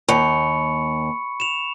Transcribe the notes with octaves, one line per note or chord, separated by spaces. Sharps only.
D#2 B5 C#6 C#7
E7 F7